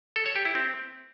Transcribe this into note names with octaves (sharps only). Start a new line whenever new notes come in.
A4
C#5
G4
E4
C4